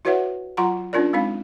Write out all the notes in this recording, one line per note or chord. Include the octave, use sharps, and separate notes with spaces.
E4 F#4 B4 C#5 E5 F#5
F#3 F4 F#5 A#5 C6
C#4 D4 F4 A#4 D5
G#3 C4 D#4 F5